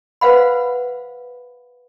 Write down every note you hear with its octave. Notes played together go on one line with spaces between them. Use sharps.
B4 C5 F5 F#5 B5